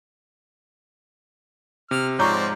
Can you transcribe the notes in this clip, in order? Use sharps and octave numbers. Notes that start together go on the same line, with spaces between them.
C3 F6
G#2 F3 C4 C#5 D5 A#5 C#6 G6